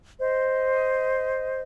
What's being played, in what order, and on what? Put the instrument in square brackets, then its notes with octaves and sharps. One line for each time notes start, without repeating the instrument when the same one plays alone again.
[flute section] C5 D#5